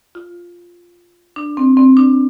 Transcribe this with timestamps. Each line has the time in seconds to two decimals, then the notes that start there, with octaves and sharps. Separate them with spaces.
0.15 F4
1.36 D4
1.57 C4
1.77 C4
1.97 D4